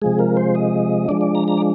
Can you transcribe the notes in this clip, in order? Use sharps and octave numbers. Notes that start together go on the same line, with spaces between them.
C3 F3 G#3 G#4
A#4
C5
D#5
F3 G#3 D4 D5
D5
A#5
A#5
D5